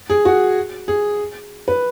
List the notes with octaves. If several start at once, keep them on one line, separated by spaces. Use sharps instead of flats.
G#4
F#4
G#4
B4